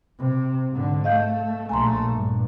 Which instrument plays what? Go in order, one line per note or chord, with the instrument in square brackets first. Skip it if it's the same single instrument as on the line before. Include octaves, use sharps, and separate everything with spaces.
[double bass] C3
G#2 D3
[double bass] A3 [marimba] D#5 F5 G6
[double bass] A#1 A3 [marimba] G#5 A#5 C6
[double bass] G2 [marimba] A#2